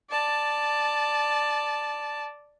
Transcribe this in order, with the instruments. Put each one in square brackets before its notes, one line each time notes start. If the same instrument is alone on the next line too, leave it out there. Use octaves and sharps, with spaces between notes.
[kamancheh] D5 A5